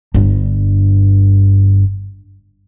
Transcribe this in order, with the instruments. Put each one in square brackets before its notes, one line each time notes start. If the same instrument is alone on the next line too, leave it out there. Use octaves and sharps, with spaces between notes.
[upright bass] G1 G2